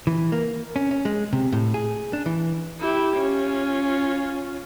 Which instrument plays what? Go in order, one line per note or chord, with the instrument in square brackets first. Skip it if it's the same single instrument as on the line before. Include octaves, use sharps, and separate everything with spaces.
[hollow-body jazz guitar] E3
A#3
C#4
C#4
G#3
C3
A2
G#4
D4
E3
[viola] E4 G4
C#4 F4